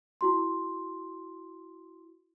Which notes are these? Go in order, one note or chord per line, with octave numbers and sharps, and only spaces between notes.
E4 F#4 C6